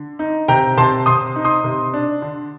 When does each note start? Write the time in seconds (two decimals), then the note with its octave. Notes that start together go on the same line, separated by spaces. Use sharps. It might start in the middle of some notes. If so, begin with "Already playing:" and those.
Already playing: D3
0.19 D#4
0.48 C3 G5 A#5
0.77 C3 A5 C6
1.06 C3 C6 D#6
1.36 D#4
1.45 C6 D#6
1.64 C3
1.94 D4
2.22 D3